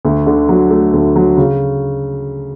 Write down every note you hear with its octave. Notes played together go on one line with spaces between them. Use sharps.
D2
D3
F#3
A3
D2
F#3
C#3